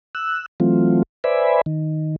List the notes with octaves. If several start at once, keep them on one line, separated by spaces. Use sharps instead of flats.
E6 F#6
E3 F#3 A3 C4 F4
B4 C5 D5 E5 G#5 B5
D#3